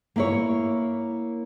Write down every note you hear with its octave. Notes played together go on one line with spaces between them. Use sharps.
A#3 E4 C#5